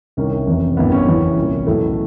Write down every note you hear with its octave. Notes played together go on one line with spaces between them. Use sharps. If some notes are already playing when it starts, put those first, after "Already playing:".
C2 C3 D#3 C#4
F1 E2 C3 E3
A1 G2 D#3 B3
C#4
F#1 E2 C#3 E3
C2 A#2
B1 A2 E3 A3